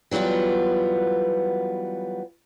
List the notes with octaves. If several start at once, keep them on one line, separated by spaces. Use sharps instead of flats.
E3 F#3 G3 B3 F4